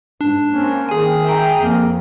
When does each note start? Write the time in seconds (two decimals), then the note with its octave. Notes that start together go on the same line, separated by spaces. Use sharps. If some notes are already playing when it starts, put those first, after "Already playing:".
0.21 G#2 D4
0.51 A#3 C4 C#4
0.89 D#3 G#4 G#5
1.23 E5 G5 A#5
1.60 F2 A#3